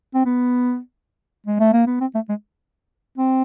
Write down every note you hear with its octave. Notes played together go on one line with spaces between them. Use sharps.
C4
B3
G#3
A3
A#3
B3
C4
A3
G#3
C4